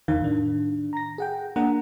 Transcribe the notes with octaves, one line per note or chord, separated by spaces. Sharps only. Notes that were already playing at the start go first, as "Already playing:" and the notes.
E2 D#3 F5
A2 D#3 D4
A#5 A#6
G#4 F#5 G5
A#3 D4 F#5 A#5